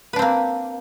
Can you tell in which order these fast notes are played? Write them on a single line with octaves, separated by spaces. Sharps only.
B4 D4 C4 A#3